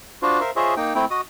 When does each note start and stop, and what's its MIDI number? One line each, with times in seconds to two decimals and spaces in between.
0.22 0.40 62
0.22 0.40 65
0.22 0.40 66
0.22 0.40 72
0.41 0.51 70
0.41 0.51 72
0.41 0.51 76
0.41 0.51 77
0.56 0.75 65
0.56 0.75 68
0.56 0.75 72
0.56 0.75 73
0.56 0.75 75
0.56 0.75 76
0.77 0.94 58
0.77 0.94 63
0.77 0.94 79
0.95 1.05 57
0.95 1.05 60
0.95 1.05 64
0.95 1.05 79
1.11 1.21 66
1.11 1.21 75
1.11 1.21 87